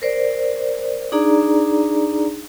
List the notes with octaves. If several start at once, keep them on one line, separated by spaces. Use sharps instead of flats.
A#4 C5 D5
D4 D#4 G#4 D5 A#5